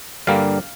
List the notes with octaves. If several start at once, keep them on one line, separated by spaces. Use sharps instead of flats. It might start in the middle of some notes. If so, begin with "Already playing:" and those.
G2 D3 G3 A#3 F5